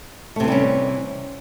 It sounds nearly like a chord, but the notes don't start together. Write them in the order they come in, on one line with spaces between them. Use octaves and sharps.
A3 C3 E3 G3 C#4